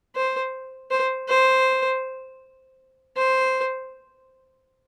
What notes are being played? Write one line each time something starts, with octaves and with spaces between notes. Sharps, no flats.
C5
C5
C5
C5